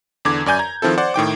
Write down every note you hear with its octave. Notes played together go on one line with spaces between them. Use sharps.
E2 D3 D6 G#6
F#2 D5 G#5 G6
A#5 G#6
D#3 F3 C4 E4 A4
C5 D5 F#5
A2 D#3 G5 D6